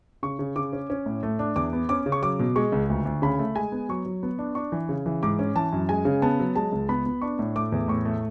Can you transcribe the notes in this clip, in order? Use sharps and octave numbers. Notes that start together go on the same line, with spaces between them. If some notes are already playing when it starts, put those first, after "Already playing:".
C#3 C#6
C#3
C#3 D6
C#4
C#4
A2
A3
D4
E2 D6
B3
C#4 D6
C#3
C#6
F#3 D6
B2
G#3 C#6
C#2
D2
D2
C#3 B5
A3
G#3 G#5
B3
F#3 C#6
F#3
B3
D4
D4 C#6
E3
C#3
E3
G#2 D6
C#4
E3 A5
F#2
G#3 G#5
C#3
B3 A5
F#3
G#3 A5
C#2
B3 B5
B3
D4 C#6
A2
A3 D6
E2
A2 C#6
A3